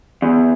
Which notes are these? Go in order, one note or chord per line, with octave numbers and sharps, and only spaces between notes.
E2